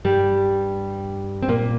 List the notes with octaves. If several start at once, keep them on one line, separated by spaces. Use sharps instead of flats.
G2 G3
C4
A#2 A#3